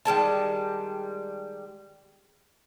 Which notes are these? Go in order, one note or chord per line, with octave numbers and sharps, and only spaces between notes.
D#3 G3 G#3 A5